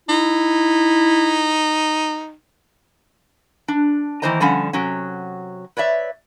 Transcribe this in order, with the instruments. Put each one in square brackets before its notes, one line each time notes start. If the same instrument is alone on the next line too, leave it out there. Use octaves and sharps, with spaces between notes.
[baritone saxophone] D#4 [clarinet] E4
[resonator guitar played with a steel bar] D4
D#3 E3 A#3 C5 D#5 A#5
D3 F3 G3 C#4 F#5
C3 F#3 C#4
B4 C#5 D5 E5